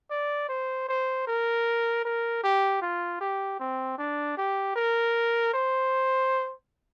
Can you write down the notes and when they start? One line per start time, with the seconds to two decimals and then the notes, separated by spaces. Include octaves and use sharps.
0.10 D5
0.49 C5
0.89 C5
1.27 A#4
2.05 A#4
2.44 G4
2.82 F4
3.21 G4
3.60 C4
3.98 D4
4.37 G4
4.76 A#4
5.54 C5